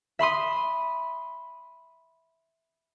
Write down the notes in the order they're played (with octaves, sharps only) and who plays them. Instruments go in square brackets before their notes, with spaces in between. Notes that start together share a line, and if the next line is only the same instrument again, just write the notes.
[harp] E5 B5 C6 D#6